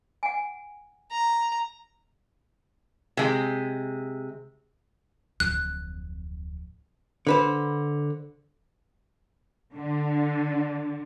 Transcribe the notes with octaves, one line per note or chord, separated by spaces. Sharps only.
F#5 G#5
A#5
C3 G#3
D1 F2 F#6
D3 B4 C5
D3